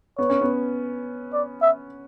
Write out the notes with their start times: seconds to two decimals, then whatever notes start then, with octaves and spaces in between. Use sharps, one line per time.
0.18 B3 C#5
0.30 C#4
0.41 B3
1.33 D5
1.62 E5